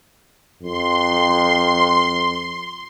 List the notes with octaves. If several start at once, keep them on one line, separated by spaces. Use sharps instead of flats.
F2 C6